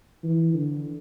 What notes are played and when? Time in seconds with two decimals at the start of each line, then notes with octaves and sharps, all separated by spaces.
0.23 E3
0.54 D3